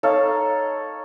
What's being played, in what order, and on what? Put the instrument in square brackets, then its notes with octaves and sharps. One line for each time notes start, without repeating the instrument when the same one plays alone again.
[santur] D#4 A4 C#5 F5